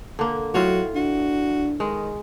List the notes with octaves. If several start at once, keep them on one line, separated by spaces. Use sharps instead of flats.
D3 A#3
A2 F#3 F4 F#4 C#5
D4 F#4
D#3 G#3